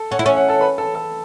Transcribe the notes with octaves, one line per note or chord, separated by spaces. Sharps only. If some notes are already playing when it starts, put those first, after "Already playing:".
Already playing: A4 A5
C#4 F#5
E4
C#4 E5
F#5
A4 A5
B4 B5
A4 A5
A4 A5